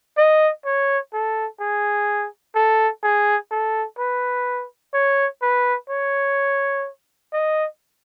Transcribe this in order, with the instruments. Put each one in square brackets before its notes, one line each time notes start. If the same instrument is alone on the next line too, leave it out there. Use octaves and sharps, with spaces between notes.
[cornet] D#5
C#5
A4
G#4
A4
G#4
A4
B4
C#5
B4
C#5
D#5